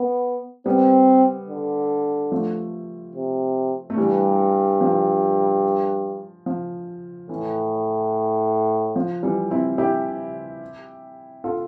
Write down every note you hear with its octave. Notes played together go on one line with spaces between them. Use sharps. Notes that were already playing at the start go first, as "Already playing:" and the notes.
Already playing: B3
G3 B3 C4
D3
F3 A3
C3
A3
G2 E3 G3
F3
F3
A2 E3
F3
E3 G3
C4 E4
E4 G4
F4 A4